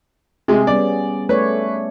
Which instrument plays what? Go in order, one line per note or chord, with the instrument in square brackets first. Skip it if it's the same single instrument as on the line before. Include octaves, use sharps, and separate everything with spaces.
[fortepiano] C3 G#3 [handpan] G#4
[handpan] G3 B3 C#4 [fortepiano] D5
[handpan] A3 C#5 D5 [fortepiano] B4